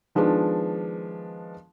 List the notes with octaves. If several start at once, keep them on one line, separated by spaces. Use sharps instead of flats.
D#3 F3 G#3 B3 D4